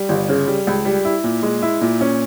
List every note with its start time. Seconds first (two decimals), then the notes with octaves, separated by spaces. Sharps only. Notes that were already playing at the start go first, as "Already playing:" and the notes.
Already playing: G3
0.09 G1
0.29 C#3
0.48 G3
0.67 C#2
0.85 G3
1.05 E4
1.24 A#2
1.43 G#3
1.62 E4
1.82 A#2
2.01 C#4